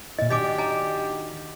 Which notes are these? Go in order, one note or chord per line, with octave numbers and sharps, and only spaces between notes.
A#2 E4 D#5
D#3 D4 F#4 G4 D#5 G#5 D6
D#5 G#5 A#5